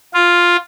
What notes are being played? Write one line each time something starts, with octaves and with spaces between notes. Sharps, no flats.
F4